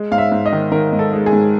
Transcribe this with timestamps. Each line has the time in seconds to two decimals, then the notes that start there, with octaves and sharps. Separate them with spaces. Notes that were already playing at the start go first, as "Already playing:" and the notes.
Already playing: G#3
0.11 G#2 F5
0.18 E5
0.32 G#2
0.46 D#5
0.52 D#3
0.72 D#3 A#4
0.93 G#2
0.99 A4
1.13 G#3
1.26 G#4
1.33 G#2